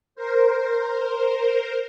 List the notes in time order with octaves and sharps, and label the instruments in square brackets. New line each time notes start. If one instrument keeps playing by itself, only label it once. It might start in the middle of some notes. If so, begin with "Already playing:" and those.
[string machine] A#4 C5